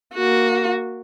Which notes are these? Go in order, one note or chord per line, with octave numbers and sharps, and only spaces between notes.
A#3 F#4